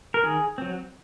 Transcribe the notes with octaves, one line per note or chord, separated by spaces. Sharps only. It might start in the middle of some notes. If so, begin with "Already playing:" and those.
A#4
D#3 G#4
F#3 C4